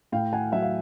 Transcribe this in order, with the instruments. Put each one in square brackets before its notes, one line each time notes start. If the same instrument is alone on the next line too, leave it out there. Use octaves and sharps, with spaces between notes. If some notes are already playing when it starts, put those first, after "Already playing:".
[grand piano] A2 F5 G5
F#5 G#5
F#3 E5 F#5
F5